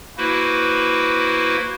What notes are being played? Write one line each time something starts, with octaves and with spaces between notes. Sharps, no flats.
A#3 E4 F#4 B4 C5